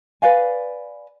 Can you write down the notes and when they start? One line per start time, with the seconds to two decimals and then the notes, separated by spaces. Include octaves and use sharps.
0.22 B4 D5 F5 G#5